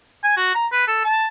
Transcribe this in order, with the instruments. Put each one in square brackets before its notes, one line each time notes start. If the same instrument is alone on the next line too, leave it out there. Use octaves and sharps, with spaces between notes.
[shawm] G#5
F#4
A#5
B4
A4
A5